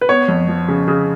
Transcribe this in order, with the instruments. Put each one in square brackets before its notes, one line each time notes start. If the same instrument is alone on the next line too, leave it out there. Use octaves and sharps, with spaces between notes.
[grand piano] B4
B3 C#5
F2
F3
C#3
C#3